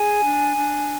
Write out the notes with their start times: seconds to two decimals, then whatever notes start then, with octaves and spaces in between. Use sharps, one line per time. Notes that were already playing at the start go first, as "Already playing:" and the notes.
Already playing: G#4 G#5
0.23 D4
0.56 D4